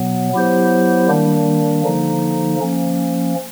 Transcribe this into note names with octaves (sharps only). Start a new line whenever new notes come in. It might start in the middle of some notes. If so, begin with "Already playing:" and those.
Already playing: B2 F#3 B3
F#3 B3 E4 G4 C5
D#3 G3 A#3 D4
D3 F3 A#3 D#4
F3 A#3 C#4